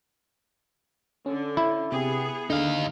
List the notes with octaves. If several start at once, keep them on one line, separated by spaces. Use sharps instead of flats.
D3 C#4
E4
C3 B3 G4 G#4
D3 D#4 F5